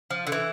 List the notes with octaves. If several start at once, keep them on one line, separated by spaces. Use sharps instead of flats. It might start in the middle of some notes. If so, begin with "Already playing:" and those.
F3
D3
E3